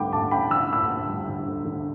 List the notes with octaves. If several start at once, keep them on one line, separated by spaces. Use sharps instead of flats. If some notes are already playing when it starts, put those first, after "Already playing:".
Already playing: D2 G3 G5 B5 D6
D2 A5 D6
D2 G5 B5
D3 E6
D2 B5 E6
D2
G3
D3
D2
D3